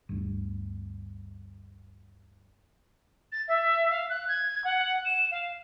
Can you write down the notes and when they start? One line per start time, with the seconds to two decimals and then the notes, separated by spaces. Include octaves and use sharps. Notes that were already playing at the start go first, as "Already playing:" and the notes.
0.09 G1 D2
3.32 A6
3.48 E5
3.90 F5
4.09 F#6
4.28 G#6
4.64 F#5
5.05 E7
5.31 F5